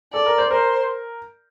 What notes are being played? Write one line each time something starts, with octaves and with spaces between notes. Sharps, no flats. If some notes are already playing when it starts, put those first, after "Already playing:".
A4 D5
A#4
C5
A#4 C5